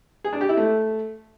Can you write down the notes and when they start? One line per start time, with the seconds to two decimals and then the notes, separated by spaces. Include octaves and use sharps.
0.24 G#4
0.33 D4
0.41 G4
0.49 E4
0.57 A3